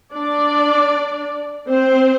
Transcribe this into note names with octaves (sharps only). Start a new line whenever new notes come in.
D4 D5
C4 C5